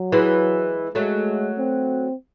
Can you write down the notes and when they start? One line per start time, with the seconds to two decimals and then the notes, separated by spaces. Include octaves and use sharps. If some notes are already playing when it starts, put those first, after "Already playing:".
Already playing: F#3
0.12 E3 G#3
0.95 F#3 G#3 A3
1.58 C4